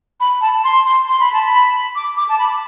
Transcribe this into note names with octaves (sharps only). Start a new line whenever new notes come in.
B5
A5
C6
C6
C6
B5
A5
B5
D6
D6
A5
B5